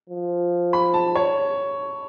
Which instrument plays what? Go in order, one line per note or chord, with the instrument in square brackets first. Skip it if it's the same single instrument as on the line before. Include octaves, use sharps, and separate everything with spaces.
[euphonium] F3
[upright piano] B5
A5
C#5